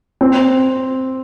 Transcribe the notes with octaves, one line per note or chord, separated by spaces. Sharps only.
C4